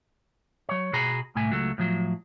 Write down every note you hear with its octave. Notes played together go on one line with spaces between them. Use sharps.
F#3 C#5
B2 F#4 G#4 G#5 A#5 B5
C2 A2 A3 G#5
C#2 F#3 A3
A2 F3 F#3